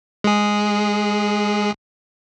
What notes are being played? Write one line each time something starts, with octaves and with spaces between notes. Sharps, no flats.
G#3 G#4